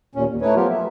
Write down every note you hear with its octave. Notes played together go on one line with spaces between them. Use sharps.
D#2 A#2 C#4
D#2
A3 D#4 E4 B4 C#5
F3 F#3 B3 F4 G4 A#4
E5